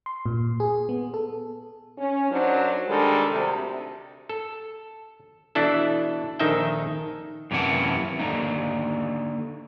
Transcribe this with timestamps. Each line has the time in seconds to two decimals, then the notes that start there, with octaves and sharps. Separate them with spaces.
0.06 C6
0.26 A#2
0.60 G#4
0.89 B3
1.14 A4
1.98 C#4
2.30 F#2 F#3 D4 D#4 C5
2.88 D#3 G3 G#3 D4 A4
3.30 D2 C3
4.29 A4
5.55 B2 E3 D4 E4 A4
6.39 A#1 D#3 D#4 A4 E5 G5
7.51 F#2 C3 E3 A#3 F#5 A5
8.19 D3 A#3 D#4